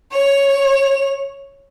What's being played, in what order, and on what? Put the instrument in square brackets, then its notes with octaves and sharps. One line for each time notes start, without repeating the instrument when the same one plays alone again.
[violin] C#5 F7